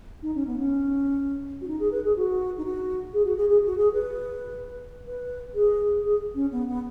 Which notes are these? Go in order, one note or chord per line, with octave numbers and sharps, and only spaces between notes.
D#4
C#4
B3
C#4
F#4
D#4
G#4
B4
G#4
F#4
D#4
F#4
G#4
F#4
G#4
G#4
F#4
G#4
B4
B4
G#4
G#4
C#4
B3
B3